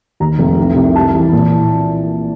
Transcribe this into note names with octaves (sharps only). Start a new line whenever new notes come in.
D#2 A#5
F1
C2
C2
G3 A5
E3
A#2